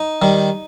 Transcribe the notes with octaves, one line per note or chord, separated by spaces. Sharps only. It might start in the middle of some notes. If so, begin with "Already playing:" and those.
Already playing: D#4
D#3 G3